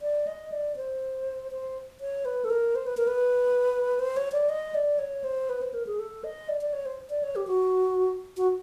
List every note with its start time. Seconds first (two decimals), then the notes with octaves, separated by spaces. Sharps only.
0.02 D5
0.27 D#5
0.52 D5
0.76 C5
1.52 C5
2.01 C#5
2.25 B4
2.44 A4
2.50 A#4
2.75 C5
2.87 B4
2.97 A#4
3.07 B4
3.99 C5
4.17 C#5
4.32 D5
4.49 D#5
4.75 D5
4.99 C#5
5.24 C5
5.49 B4
5.62 C5
5.74 A#4
5.87 G#4
5.99 A4
6.24 D#5
6.49 D5
6.61 D5
6.73 C#5
6.86 C5
7.10 D5
7.23 C#5
7.36 G4
7.47 F#4
8.37 F#4